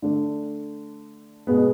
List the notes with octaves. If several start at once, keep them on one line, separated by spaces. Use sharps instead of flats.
D3 A3 D4
B2 G#3 B3